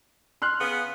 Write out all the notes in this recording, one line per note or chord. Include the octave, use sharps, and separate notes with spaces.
C6 F6 F#6
C#3 B3